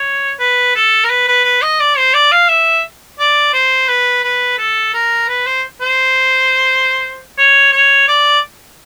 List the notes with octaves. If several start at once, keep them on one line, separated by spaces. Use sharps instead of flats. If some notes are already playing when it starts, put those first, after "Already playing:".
Already playing: C#5
B4
A4
A#4
B4
B4
B4
D#5
D5
C5
D5
F5
E5
D5
C5
B4
B4
A4
A#4
B4
C5
C5
C#5
C#5
D5